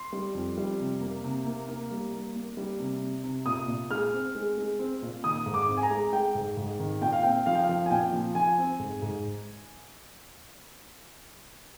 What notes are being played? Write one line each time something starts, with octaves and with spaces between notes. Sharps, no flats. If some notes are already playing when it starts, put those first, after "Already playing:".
Already playing: C6
G3
F2
G3
C3
A#3
C3
A#3
A#3
G3
A#3
A#3
G3
C3
C3
C3
A#2 D#6
A#2
G#3 F6
C4
G#3
G#3
C4
A#2
D#3 D#6
G#2
D6
C4
G#5
A#5
G#3
G#3 G5
G#2
G#2
D#3
A#2 G5
F5
C4 G5
F3 F5
G5
F5
F3
G#5
A#2 G5
F3
F3 G#5
C4
G#2
G#2